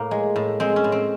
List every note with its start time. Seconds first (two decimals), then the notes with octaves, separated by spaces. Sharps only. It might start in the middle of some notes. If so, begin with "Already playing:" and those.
Already playing: A2 A#3
0.11 G#3
0.36 A2
0.60 G#3 C4
0.76 C#4
0.84 A2
0.92 C4